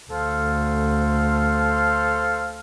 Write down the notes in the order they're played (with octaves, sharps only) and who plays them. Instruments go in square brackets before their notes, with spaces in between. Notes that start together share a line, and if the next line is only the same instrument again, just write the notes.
[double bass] D2 [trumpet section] A4 C5 F5